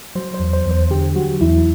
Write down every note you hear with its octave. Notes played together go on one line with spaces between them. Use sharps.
F#3 C5
C5
E2
C5
E2
C5
D3 G4
F#3 F#4
E2 E4